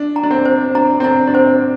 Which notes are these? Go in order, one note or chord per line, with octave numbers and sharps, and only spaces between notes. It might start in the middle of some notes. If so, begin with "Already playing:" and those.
Already playing: D4
A#5
D4
C4
C5
D4 A#5
C4
D4 A#5
D4
C4 C5